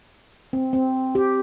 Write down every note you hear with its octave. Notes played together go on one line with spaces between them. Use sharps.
C4
C4
G4